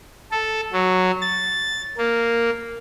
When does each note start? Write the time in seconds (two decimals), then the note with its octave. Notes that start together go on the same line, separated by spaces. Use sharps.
0.32 A4
0.73 F#3
1.21 A6
1.98 A#3